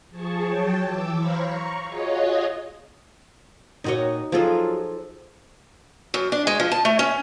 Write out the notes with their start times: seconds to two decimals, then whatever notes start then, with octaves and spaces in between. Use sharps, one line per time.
0.10 F3 G#4 A5 C#6
0.46 F#3 C#5 G5 A5
0.84 E3 D6 E6
1.16 C5 C#5 F5 A#5 B5 C#6
1.45 A#5 C#6
1.86 F4 F#4 G#4 C#5 D#5
3.84 A#2 D#4 F#4 C#5 D#5
4.32 F3 F#3 F4 G#4 A4
6.14 F#2
6.32 D4
6.47 G#3
6.60 F3
6.72 A5
6.85 A3
6.99 C#4